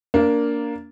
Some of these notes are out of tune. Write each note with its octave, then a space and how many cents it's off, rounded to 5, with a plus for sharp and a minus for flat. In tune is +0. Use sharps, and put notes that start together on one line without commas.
A#3 +0 D4 -20